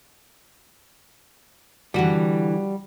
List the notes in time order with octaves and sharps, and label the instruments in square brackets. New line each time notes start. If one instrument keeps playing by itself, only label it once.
[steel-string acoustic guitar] D3 E3 [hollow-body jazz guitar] G3 F#4